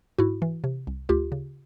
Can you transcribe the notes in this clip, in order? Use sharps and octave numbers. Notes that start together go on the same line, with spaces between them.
G#2 E4 F#4
E3
C3
C2
D2 F4 G4
C#3